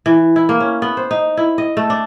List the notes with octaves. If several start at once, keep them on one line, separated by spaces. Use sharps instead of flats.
E3
E4
A#3
C#4
B3
C5
D#4
E4
D#5
A3
D4